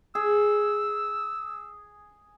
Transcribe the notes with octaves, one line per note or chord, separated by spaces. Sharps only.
G#4 E6